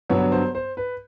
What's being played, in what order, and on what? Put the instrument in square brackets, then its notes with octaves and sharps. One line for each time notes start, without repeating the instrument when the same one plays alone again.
[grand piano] G2 D3 F#3 B3 C#5
C5
C5
B4